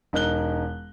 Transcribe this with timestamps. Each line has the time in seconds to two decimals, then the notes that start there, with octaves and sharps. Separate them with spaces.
0.13 E1 D#4 A#4 F#6 G7